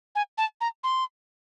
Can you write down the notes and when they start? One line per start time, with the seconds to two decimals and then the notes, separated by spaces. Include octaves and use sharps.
0.15 G#5
0.38 A5
0.61 A#5
0.84 C6